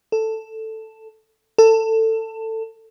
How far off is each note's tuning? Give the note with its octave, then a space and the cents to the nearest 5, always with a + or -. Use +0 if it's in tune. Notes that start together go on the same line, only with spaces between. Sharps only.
A4 +5
A4 +20